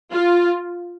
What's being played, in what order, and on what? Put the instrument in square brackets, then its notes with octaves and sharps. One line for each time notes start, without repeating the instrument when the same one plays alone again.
[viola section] F4